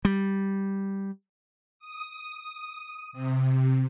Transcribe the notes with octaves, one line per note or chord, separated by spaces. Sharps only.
G3
D#6
C3